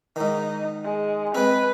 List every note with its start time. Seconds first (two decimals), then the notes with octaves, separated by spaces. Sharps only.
0.16 G#2 D#3 D#4
0.84 G#3
1.35 G#3 C4 B4